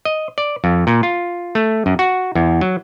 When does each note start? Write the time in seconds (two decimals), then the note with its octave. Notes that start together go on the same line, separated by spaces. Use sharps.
0.05 D#5
0.38 D5
0.64 F2
0.87 A#2
1.03 F4
1.55 A3
1.86 F#2
1.99 F#4
2.35 E2
2.61 F#3